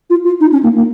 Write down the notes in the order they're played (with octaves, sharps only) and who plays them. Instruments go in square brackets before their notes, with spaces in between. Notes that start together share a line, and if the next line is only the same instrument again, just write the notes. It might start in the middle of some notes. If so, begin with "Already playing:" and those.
[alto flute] F4
F4
D#4
C#4
A#3
A#3